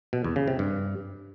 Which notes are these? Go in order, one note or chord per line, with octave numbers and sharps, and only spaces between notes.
B2
E2
C#3
C3
G2